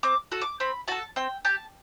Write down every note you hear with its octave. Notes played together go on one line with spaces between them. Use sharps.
C4 D6
F#4 A4
D6
C4 B5
F#4 A4 A5
C4 G5
G4 A5